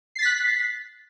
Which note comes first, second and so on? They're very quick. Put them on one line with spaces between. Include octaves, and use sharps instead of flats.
C7 A6 B6 F#6